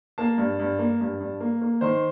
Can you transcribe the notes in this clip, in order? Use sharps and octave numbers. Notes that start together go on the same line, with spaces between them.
A#3 A5
G2
G2
A#3
G2
G2
A#3
A#3
D#3 C5